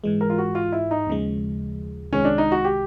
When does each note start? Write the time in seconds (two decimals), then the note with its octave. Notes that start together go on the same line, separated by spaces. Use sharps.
0.04 G#2 E3 G#3
0.21 A#4
0.30 F4
0.38 F#4
0.55 F4
0.72 E4
0.91 D#4
1.07 D#2 C#3 F3 G#3
2.13 C2 C3 D#3 G#3 C#4
2.25 D4
2.38 D#4
2.52 F#4
2.64 G4